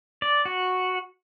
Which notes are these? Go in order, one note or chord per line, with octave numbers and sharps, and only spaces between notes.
D5
F#4